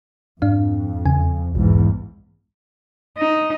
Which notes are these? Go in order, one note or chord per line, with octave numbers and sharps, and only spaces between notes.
F2 G#2 D4 F5
E2 C#3 G#5
B1 E2 G#2
D#4